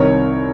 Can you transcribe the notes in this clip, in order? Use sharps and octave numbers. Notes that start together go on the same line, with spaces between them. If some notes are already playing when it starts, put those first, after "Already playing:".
Already playing: C2 C3 D#3 A#4 C#5